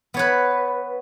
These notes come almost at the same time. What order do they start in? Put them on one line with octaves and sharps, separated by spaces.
B3 C#5 B4